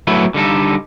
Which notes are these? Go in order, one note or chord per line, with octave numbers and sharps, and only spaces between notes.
F#3 A3 B3 E4 B4
D3 G3 D#4 A4